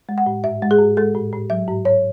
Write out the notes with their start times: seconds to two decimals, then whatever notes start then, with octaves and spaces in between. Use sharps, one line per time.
0.09 G#3
0.18 F#5
0.26 A2
0.44 G#2 E5
0.62 G#3
0.71 G#4
0.79 G#2
0.97 G#3 A4
1.14 A2
1.33 A2
1.50 F#3 E5
1.68 G#2
1.85 G#2 C#5